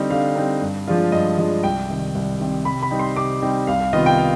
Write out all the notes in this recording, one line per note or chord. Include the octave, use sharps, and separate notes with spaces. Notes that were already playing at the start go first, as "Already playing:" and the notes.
Already playing: D3 G3 C4 D#4
D3 F5
G3 C4 D#4
G2
F3 G#3 D4 F4
G2 D#5
F3 G#3 D4 F4
C2 G5
C3 D#3
C2
C3 D#3
C3 B5
B5
G3 C4 D#4
C6
C3 D6
G3 C4 D#4
C2 F5
F5
C3 D#3 B3 F4 D#5
G5
F5